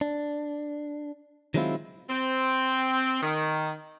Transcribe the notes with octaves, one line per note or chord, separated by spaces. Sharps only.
D4
D#3 F#3 G#3 C4 E4 F4
C4
D#3